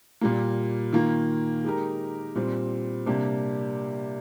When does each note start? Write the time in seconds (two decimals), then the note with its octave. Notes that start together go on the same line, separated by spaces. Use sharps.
0.21 A#2 G3 A#3
0.93 D#3 A#3 F4
1.64 G#3 D#4 G4 A#4
2.35 A#2 G3 C4
3.06 C3 G3 A#3 D4 G4